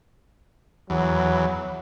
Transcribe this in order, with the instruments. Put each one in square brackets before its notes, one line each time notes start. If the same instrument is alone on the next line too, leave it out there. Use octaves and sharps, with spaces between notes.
[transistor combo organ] E2 [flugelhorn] F#3